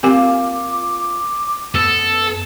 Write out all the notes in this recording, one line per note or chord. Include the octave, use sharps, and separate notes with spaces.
A#3 C4 F4 G4 G#5 D6
F#2 B3 A4